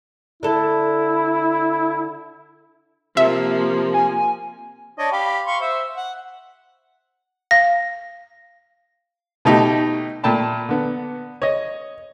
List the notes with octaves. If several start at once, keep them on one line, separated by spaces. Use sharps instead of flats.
D3 E4 A4
C3 F3 A#3 E5
G#5
D4 C#5 D#5
G4 F5 B5
F5 C6 C#6
C5 E5
F#5
F5 A#6
B2 A3 D#4 G4
A#2 A3 G5 A5 B5
D3 B3
C#5 D#5